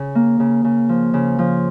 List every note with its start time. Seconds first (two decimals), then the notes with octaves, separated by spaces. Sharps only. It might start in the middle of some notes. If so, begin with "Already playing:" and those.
Already playing: C#3
0.15 A#3
0.40 C#3
0.64 C#3
0.89 F3
1.14 C#3
1.39 F3